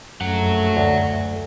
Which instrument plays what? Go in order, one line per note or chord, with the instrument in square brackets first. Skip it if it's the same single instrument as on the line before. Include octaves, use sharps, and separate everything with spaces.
[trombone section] A#1 A3 [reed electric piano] F#2 [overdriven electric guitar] C#5 F#5
[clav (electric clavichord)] D2